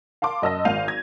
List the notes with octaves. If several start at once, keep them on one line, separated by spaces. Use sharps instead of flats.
F5 A5 C6 D6
F#2 D#5 A5 E6 A#6
G#1 F5 G6 D#7 F7
G#6 A#6